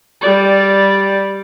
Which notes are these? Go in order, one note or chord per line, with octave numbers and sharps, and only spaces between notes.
G3 D5